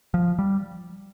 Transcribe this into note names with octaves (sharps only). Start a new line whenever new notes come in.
F3
G3